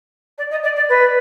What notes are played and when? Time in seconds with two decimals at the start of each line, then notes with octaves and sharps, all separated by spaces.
0.38 D5
0.51 D#5
0.63 D5
0.76 D5
0.89 B4